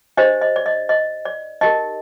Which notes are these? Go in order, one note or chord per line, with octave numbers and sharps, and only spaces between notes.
D4 G4 C5 D#5
D#5
D5
D#5
D#5
D5
D#4 G4 A#4 D#5